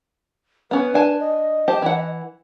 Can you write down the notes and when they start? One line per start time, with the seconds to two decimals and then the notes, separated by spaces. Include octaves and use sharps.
0.71 B3 C#4 B4
0.94 D4 G#5 A5
1.20 D#5
1.68 G4 C5 A5
1.82 E3 F#5